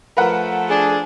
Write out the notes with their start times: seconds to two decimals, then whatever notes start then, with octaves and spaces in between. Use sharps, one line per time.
0.17 F3 A3 A#4 B4 F#5
0.68 D4 G#4